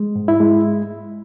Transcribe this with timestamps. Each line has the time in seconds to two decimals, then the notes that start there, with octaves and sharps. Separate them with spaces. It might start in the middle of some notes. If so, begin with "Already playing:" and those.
Already playing: G#3
0.16 G#2
0.28 E4
0.40 G#3